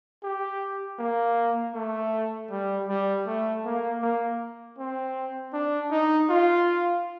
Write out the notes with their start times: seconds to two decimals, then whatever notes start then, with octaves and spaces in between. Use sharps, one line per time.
0.23 G4
0.99 A#3
1.74 A3
2.50 G3
2.88 G3
3.27 A3
3.64 A#3
4.02 A#3
4.78 C4
5.53 D4
5.91 D#4
6.29 F4